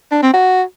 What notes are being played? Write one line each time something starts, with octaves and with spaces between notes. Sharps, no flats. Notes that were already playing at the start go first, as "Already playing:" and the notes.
D4
C4
F#4